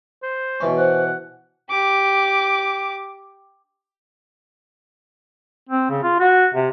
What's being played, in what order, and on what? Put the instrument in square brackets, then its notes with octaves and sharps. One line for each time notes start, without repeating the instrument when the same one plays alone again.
[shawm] C5
[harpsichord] B2 E3 C#4
[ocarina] C5 [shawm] F#5
[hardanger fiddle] G4 D6
[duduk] C4
C#3
F4
F#4
C3